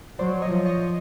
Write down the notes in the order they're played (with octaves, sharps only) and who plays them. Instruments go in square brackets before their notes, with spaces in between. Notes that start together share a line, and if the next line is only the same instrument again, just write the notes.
[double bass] F#3 [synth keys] C5 D5
[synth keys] C#5 D#5
[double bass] F3
[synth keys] C#5 D#5